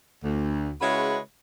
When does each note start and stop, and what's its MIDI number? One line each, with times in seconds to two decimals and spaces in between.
0.24 0.71 38
0.80 1.18 49
0.80 1.18 56
0.80 1.18 64
0.80 1.18 66
0.80 1.18 71
0.80 1.18 73